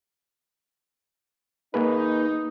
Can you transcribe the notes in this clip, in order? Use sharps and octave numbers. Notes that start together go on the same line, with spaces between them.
A#3 D#4 G#4 B4